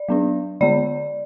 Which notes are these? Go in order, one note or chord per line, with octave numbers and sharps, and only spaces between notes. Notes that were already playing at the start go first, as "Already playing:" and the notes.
Already playing: D5
F#3 B3 D4
D3 G#3 B3 D5